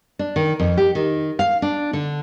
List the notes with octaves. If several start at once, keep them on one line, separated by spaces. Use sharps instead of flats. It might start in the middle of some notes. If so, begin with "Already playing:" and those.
D4
D#3
F2
G4
D#3
F5
D4
D3